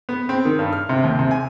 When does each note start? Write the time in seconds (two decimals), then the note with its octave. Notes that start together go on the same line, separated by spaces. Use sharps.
0.09 B3
0.29 C4
0.45 D#3
0.59 G2
0.73 F6
0.89 C3
1.04 D#2
1.19 C3
1.31 G#5